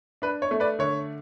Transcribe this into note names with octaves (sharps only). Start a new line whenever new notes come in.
D4 B4
C#5
A3
B4 D5
D3 C#5